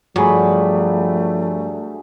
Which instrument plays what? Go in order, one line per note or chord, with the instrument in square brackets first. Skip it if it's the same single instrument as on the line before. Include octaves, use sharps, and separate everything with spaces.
[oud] G2 [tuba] F3 [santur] F#3 G#4 B5 [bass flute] A3